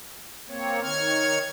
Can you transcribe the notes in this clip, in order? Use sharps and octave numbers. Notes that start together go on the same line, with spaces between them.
A#3 C4 C#5
D#3 C#5 F6 G#6